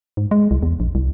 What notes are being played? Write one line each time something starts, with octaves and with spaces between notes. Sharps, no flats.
G#2
G#3
C2
E2
A#1
C2